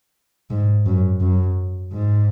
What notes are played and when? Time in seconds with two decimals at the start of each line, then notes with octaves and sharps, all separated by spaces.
0.50 G#2
0.86 F#2
1.21 F#2
1.92 G#2